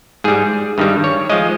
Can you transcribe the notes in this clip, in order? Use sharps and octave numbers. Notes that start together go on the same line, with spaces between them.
G#2 G3 G#4
G2 D#3 G3
C#5
F3 G#3 D#5